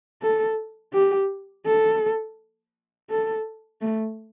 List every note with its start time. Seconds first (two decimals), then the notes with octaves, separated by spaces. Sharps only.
0.22 A4
0.94 G4
1.66 A4
3.10 A4
3.81 A3